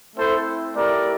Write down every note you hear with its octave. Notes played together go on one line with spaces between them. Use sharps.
A3 C4 E4 A4 C5
A3 E4 G4 A#4 D5